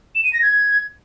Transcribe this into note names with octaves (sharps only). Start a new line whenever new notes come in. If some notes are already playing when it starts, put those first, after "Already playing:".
E7
D#7
A#6
G#6